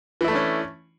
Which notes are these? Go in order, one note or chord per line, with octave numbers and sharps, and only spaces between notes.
E3 A3 C#4 D4 E4